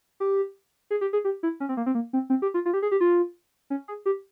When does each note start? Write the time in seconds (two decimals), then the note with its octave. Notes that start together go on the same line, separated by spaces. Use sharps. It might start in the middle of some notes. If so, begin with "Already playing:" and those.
0.20 G4
0.91 G#4
1.01 G4
1.13 G#4
1.25 G4
1.43 E4
1.60 C#4
1.69 C4
1.77 A#3
1.86 C4
1.95 A#3
2.13 C4
2.30 C4
2.42 G4
2.54 F4
2.66 F4
2.74 G4
2.82 G#4
2.91 G4
3.01 F4
3.70 C#4
3.88 G#4
4.06 G4